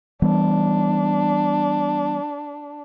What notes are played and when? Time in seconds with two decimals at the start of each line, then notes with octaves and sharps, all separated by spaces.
0.22 E3 G3 B3 D4